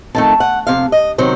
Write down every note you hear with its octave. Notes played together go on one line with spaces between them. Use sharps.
F2 D#3 A3 A5
F#5
F2 C3 F5
D#5
C3 D#3 F#3 C5